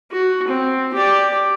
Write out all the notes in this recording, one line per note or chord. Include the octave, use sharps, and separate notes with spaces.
F#4
C4
G4 D5